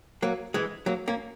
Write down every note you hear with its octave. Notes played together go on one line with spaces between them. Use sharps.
F#3 A#3
E3 G#3
F#3 A#3
A#3 C#4